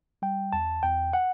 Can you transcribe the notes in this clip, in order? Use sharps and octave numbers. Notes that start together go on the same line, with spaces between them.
G3 G5
E2 A5
E2 G5
F#5